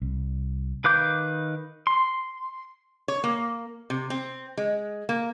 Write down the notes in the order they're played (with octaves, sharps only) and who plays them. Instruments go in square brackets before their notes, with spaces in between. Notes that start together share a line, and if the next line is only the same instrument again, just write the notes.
[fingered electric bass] C2
[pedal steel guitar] D#3 B4 F5 D6 G6
C6
[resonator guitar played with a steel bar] C#5
A#3
C3
C4
G#3
A#3